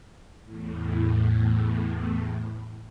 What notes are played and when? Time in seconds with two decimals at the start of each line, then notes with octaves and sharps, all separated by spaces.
0.44 E2 A2